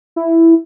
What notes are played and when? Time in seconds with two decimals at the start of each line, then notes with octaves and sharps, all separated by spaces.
0.16 E4